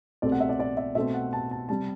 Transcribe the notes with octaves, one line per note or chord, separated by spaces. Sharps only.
C2 B2 A3 C4 D5
F#5
E5
D5
D5
E5
B2 A3 C4 E5
F#5
A5
A5
C3 G3 A5